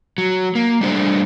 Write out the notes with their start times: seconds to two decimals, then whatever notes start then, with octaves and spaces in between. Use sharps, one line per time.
0.18 F#3
0.55 A#3
0.81 G3 A3 D4 B4 C5